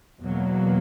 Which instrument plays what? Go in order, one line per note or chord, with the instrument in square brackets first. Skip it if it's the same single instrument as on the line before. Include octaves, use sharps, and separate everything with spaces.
[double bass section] E2 B2 F#3 A#3